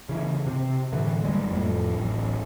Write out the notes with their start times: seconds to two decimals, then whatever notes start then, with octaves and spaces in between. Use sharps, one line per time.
0.09 C#3 E3
0.47 C3
0.93 A2 D3 E3
1.24 F#1 C2 G3 G#3
1.51 F2 A2
1.97 D1 A1